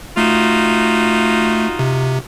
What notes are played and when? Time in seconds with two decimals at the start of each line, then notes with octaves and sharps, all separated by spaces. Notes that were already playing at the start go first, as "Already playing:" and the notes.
0.17 A3 D#4 F4 F#4
1.79 C3